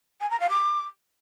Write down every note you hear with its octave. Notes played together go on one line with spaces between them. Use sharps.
G#5
A#5
F5
D6